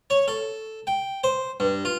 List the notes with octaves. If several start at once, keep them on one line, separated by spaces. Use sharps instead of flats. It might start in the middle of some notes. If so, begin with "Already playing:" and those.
C#5
A4
G5
C5
G2
F4